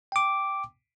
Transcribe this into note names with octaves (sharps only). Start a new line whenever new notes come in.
G5 D6